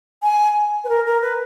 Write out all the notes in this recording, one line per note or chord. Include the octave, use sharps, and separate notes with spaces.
G#5
B4
A#4
A#4
B4